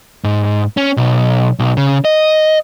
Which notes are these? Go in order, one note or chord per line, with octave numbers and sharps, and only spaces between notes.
G#2
C#4
B1
B1
C#3
D#5